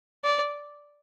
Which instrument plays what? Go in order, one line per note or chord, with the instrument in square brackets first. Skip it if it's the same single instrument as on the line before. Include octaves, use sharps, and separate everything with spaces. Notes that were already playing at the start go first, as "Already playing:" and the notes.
[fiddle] D5